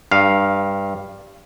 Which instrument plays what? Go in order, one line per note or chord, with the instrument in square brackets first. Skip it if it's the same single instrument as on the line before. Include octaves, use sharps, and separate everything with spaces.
[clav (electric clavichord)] G2 F5